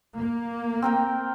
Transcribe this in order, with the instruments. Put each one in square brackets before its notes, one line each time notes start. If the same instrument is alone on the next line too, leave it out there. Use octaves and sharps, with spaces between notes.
[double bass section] A#3
[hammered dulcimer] C4 A#4 G5